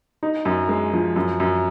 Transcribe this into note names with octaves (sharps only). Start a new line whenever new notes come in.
D#4
F#2
G#3
F3
F#2
F#2